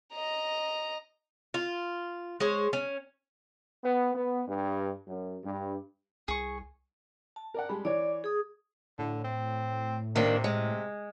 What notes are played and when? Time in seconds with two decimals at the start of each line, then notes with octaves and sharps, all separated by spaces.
0.13 D#5 A#5
1.54 F4
2.40 G#3 C5 C#5
2.73 C#4
3.84 B3
4.15 B3
4.48 G2
5.07 F#2
5.44 G2
6.28 C2 G#4 C#6
7.36 A5
7.54 A#4 D5 F#5
7.69 G3 G#3 B5
7.85 E3 C#5 D5 D6
8.24 G#4 D#6
8.99 A2 D3
9.24 C4
10.16 C3 D#3 A#3 D4
10.44 G#3